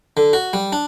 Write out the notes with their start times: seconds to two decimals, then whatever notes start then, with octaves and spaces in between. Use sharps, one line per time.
0.17 D3
0.33 F#4
0.53 G3
0.72 D4